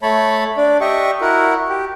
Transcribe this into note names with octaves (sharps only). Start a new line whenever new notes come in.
A3 C#5 A5 B5
D4 D5
G4 D#5 E5 C#6
E4 F#4 A#4
G4